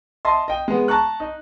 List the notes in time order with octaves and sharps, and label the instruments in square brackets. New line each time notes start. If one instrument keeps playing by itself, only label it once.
[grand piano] D#5 E5 A5 C6
D#5 G5
G#3 B3
A5 A#5 C#6 F#6
D#4